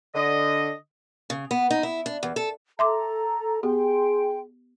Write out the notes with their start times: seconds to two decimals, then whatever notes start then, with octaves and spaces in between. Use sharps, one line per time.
0.15 D3 D#5
1.30 C#3
1.51 B3
1.71 D#4
1.83 E4
2.06 D4
2.23 E2
2.36 A4
2.79 A4 E5 A#5 C6 D6
3.63 B3 G4 G#4 G5 C6